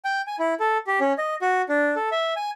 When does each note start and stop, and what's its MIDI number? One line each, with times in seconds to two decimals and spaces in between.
0.05 0.22 79
0.27 0.36 80
0.39 0.54 64
0.60 0.78 69
0.87 0.99 67
1.00 1.13 61
1.18 1.35 75
1.42 1.62 66
1.69 1.95 62
1.96 2.09 69
2.12 2.34 76
2.36 2.50 80